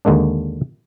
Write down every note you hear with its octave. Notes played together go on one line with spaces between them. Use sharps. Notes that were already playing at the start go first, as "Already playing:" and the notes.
D#2 D3 G#3 A#3 D4